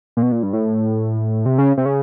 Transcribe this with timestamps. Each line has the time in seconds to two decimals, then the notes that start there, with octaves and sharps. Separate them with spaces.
0.17 A#2
0.22 B2
0.32 A#2
0.43 G2
0.53 A2
1.46 C3
1.58 C#3
1.77 C3
1.86 C#3